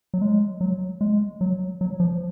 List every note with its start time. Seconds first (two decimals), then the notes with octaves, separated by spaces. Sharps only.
0.14 F#3
0.22 G#3
0.61 F#3
1.01 G#3
1.41 F#3
1.81 F#3
2.00 F3